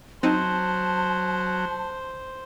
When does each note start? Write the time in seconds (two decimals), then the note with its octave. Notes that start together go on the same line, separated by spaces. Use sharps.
0.23 F#3 C4 D#4 C5 A5